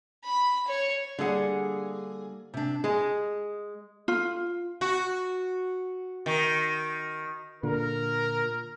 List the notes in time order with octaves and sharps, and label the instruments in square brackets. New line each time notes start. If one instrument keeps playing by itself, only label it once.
[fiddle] B5
C#5
[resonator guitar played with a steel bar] D3 G#4 [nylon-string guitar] G3 A#3 F#5
[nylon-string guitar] C3 D4
[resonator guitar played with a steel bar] G#3 [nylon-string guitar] G#4 D#5
[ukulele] F4
[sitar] F#4
D#3
[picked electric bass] A#2 [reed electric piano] D3 [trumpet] A#4